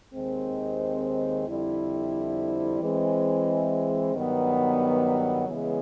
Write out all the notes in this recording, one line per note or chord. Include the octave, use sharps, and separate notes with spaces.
D#2 D#3 G#3 C4
F2 D3 G3 C4 E4
E3 G#3 C4
G2 D#3 F#3 B3
C#3 E3 G#3 B3